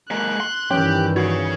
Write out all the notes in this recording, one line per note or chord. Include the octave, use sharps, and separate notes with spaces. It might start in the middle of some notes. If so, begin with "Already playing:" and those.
G#3 A#3 F#6
C6
G2 D#3 E3 C#4 G4 C#5 G5
F#4 G#4 C#5